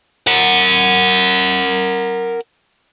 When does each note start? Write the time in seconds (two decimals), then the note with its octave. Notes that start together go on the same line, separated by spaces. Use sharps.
0.27 A#4 F#5